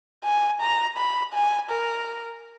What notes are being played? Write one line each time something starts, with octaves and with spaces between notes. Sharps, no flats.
G#5
A#5
B5
G#5
A#4